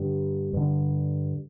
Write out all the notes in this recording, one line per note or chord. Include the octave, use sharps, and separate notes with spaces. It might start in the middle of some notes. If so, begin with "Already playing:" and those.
Already playing: G2 D3 G3
G2 D3